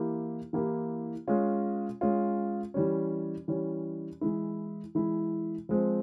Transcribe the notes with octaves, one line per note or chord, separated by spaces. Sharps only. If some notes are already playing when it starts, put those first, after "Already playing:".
Already playing: E3 A#3 E4 G4
E3 A#3 E4 G4
G#3 C#4 F4
G#3 C#4 F4
E3 G3 C#4
E3 G3 C#4
E3 G#3 E4
E3 G#3 E4
F3 G#3 C4